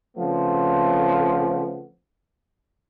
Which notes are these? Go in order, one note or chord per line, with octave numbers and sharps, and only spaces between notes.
C#3 F3 A3 B3 C4